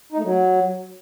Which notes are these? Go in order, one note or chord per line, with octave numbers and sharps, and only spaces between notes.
D#4
A3
F#3